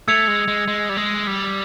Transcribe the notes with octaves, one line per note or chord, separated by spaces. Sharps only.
A3 E6 G#6 C#7 F7
G#3
G#3
G#3
G3
G#3
G3